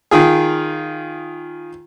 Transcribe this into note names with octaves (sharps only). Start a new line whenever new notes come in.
D#3 F4 G#4